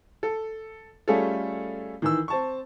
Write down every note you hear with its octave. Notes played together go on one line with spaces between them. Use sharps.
A4
G3 A3 C#4 F4 G#4 A4
D#3 E3 E6
C4 A5 C#6